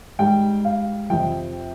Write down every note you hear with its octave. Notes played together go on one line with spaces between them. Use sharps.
G#2 G3 G5
F5
F2 C3 F3 G5